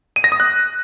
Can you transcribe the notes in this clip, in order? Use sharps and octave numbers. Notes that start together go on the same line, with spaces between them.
D#7
A#6
D#6
F#6